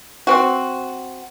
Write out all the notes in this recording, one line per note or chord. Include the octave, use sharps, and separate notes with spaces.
C4 F#4